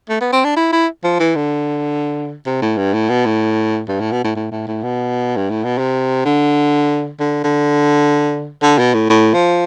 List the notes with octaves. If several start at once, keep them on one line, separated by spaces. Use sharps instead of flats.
A3
B3
C4
D4
E4
E4
F3
E3
D3
C3
A2
G2
A2
B2
A2
G2
A2
B2
A2
A2
A2
A2
B2
G2
A2
B2
C3
D3
D3
D3
D3
B2
A2
A2
F3